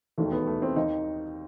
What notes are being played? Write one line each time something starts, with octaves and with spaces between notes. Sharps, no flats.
E1 D#2 D#3 A3
B3
A3
C4
D#2 D#3 D#4